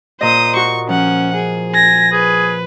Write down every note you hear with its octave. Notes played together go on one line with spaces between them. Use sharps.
A#2 C5 D#5 D#6
F#4 C#6
F3 C#4 F#5
G#4
G#5 A#6
G#4 B4